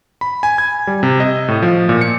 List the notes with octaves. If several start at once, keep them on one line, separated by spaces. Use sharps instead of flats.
B5
G#5
G#6
G3
C3
D#5
A2
F3
A#2
C#7